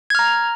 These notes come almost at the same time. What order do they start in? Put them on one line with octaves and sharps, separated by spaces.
G#6 F6 A#5